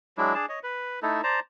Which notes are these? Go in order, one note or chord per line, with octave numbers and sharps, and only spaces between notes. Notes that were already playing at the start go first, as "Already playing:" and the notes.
F#3 G#3 D4 E4
D4 G#4 A5
C#5 D#5
B4
A3 D#4 E4 A4
C5 D5 A5 A#5